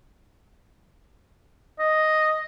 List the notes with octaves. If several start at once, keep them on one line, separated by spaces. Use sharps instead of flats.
D#5